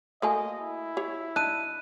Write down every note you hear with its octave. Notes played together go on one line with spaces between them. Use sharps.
A3 A#3 F#4 A4 D#5 G#5
E4
G4 C#5
D4 D#4 A5 F#6 D#7